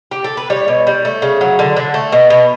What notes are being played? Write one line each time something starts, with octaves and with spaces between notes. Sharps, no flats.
G4
A4
B4
G3 C#5
B2
G3
A3
C#3
F#3
D3
D3
A3
B2
B2